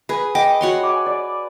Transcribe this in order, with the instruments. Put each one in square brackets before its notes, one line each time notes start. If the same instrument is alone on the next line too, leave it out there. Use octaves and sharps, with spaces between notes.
[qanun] G#4 [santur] B4
[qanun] D#5 D6 [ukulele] G5
[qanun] F#4 C#5 C6
[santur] G#5 D6
D5